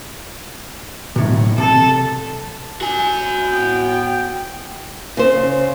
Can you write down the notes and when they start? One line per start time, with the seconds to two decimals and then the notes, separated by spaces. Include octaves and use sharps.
1.16 B1 A2 C3
1.58 C3 A4
2.81 F#4 G#5
3.50 A2 B3 G5
5.17 C#3 C5